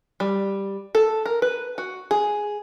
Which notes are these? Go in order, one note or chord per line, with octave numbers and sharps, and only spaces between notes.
G3
A4
A#4
B4
F#4
G#4